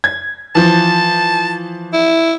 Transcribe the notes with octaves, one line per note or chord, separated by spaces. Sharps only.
G#6
E3 F3 A5
E4